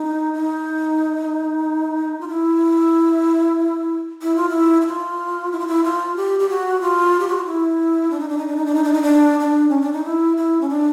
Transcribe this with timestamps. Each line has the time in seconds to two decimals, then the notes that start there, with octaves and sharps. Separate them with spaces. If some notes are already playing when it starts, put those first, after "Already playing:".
Already playing: D#4
0.34 D#4
2.21 F4
2.29 E4
4.22 E4
4.36 F4
4.49 E4
4.81 E4
4.87 F4
5.52 E4
5.60 F4
5.67 E4
5.84 F4
6.16 G4
6.39 G4
6.49 F#4
6.81 F4
7.20 G4
7.28 F#4
7.37 F4
7.46 E4
8.11 D4
8.20 D#4
8.29 D4
8.38 D#4
8.48 D4
8.56 D#4
8.66 D4
8.75 D#4
8.84 D4
8.93 D#4
9.02 D4
9.40 D4
9.69 C#4
9.81 D4
9.93 D#4
10.05 E4
10.37 E4
10.61 C#4
10.69 D4